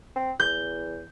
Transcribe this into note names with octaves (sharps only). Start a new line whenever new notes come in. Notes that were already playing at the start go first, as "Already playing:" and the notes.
C4
E2 G6